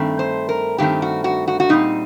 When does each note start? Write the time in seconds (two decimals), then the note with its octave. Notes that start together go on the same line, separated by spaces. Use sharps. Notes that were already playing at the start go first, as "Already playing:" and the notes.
Already playing: G2 D#3 A3 C4
0.19 C5
0.49 A#4
0.78 G2 D#3 A3 C4 G4
1.02 F#4
1.24 F#4
1.48 F#4
1.60 F#4
1.69 A#2 G3 C4 D#4